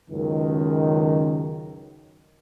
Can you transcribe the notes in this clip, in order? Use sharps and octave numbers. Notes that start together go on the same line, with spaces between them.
C#2 F#2 D#3